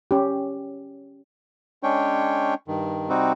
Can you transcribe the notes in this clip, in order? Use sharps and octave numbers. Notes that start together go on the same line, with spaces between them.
C#4 G4
G#3 C#4 D4 C#5 G5
G2 D#3
C3 G3 C4 D#4 F#4